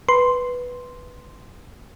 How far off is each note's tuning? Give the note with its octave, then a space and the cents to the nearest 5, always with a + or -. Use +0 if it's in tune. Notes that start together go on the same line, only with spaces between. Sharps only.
B4 +0 C6 +0